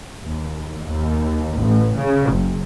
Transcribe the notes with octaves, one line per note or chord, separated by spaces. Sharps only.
D#2
D#2
A1
C#3
F#1